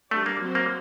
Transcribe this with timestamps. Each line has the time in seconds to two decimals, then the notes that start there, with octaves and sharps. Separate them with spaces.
0.11 G3 A3 D4 G4 D5
0.26 A#3
0.41 F#3 C4 F#4 C5
0.55 A#3